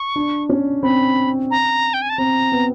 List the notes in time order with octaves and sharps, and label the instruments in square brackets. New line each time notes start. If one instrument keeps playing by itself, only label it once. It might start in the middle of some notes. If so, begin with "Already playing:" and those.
Already playing: [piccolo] C#6
[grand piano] D4
C#4
[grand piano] C4 [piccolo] B5
[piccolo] A#5
G5
G#5
A5
[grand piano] C4 [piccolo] A#5
[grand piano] B3